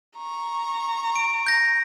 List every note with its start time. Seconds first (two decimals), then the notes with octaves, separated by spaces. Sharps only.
0.16 A#5 C#6
1.16 D7
1.46 G6 A#6